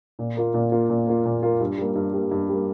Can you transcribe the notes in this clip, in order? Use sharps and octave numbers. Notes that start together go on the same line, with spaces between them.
A#2
A#3 F4
A#2
A#3 F4
A#2
A#3 F4
A#2
A#3 F4
G2
G3 A#3
G2
G3 A#3
G2
G3 A#3